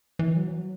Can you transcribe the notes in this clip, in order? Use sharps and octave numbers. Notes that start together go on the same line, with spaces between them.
E3
F#3
E3
F#3